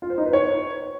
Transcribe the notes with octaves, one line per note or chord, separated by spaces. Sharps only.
F4
C5
D#4
B4
C#5